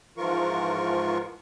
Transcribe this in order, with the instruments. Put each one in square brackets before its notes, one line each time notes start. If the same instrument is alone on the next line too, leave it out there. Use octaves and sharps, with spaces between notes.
[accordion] G#2 E3 F3 F4 A#4 C#6